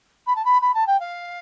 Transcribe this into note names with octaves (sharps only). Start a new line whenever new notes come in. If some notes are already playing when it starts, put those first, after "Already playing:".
B5
A5
B5
B5
A5
G5
F5